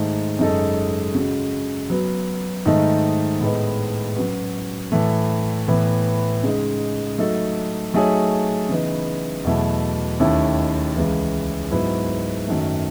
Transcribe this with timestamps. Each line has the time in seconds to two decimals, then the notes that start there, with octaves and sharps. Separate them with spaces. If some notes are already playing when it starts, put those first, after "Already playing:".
Already playing: G#2 D#3 A3
0.39 F#2 C#3 G#3 D#4 A4
1.15 C#3 G#3 C#4 F#4
1.90 F#3 B3 F#4
2.66 G#2 D#3 A3 D#4
3.41 A2 G#3 B3 D#4
4.16 F#3 C#4 F#4 B4
4.92 A2 E3 A3
5.68 A2 E3 B3
6.43 C#3 G#3 D#4
7.18 F#3 A3 D#4 A4
7.94 F#3 A3 D#4 G#4 C#5
8.69 C#3 E3 B3 D#4
9.44 E2 B2 F#3 A3 E4
10.20 D#2 D#3 A3 C#4 E4
10.96 C#2 C#3 E3
11.71 G#2 F#3 B3 E4 B4
12.47 F#2 D#3 F#3 A3